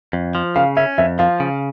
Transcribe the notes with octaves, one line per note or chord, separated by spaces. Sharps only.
F2
F3
C#3 F5
C#4 E5
F2 E5
F3 F5
C#3